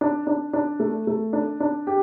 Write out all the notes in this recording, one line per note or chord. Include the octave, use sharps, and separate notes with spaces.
D4
D4
D4
A3
A3
D4
D4
G4